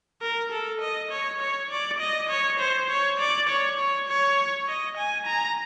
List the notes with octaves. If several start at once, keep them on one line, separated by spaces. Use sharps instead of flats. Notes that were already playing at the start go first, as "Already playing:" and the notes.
A#4
A4
D#5
C#5
C#5
D5
D#5
C#5
C5
C#5
D5
C#5
C#5
C#5
D#5
G#5
A#5